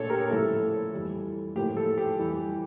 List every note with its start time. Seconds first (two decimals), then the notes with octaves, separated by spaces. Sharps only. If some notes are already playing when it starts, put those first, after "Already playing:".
Already playing: A#2 A3 D4 A4 C#5
0.10 G4 A#4
0.30 A2 F3 A3 C#4 E4 A4
0.93 F2 E3 G3
1.56 A2 F3 A#3 G4
1.77 A4
1.98 G4
2.19 F2 E3 G3